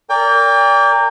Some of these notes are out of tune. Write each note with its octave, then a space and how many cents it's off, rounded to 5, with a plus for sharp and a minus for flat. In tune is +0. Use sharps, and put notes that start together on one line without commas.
A#4 -20 D5 -30 G5 +30